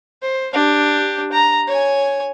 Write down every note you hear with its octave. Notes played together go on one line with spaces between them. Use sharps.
C5
D4 G4
A#5
C#5 G#5